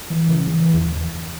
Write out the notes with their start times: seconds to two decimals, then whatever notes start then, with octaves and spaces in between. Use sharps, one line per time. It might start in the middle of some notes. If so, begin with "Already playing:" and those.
0.10 E3
0.29 C#3
0.47 E3
0.74 E2